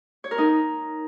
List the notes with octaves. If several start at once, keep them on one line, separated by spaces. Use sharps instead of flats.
C#5
A#4
D#4